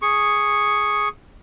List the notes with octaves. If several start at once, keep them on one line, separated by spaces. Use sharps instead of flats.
G#4 C#6